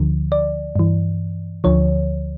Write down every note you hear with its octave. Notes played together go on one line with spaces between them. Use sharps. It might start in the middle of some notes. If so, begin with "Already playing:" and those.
Already playing: D2 D3 F3
D5
G2 E3
D2 D3 F3 C#5